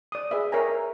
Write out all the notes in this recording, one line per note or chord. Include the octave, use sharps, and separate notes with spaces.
D5 D#6
G#4 B4 E5
A#4 C#5 E5 G5 G#5 A#5